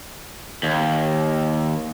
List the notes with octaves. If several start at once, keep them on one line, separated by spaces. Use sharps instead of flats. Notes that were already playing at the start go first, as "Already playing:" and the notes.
D#2